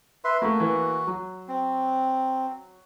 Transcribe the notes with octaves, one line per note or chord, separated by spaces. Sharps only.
B4 E5 C6
A3 A#3 F#4
E3 A#3 B4
F#3
C4